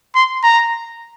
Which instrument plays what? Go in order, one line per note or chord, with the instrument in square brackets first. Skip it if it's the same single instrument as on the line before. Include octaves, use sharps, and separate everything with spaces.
[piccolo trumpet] C6
A#5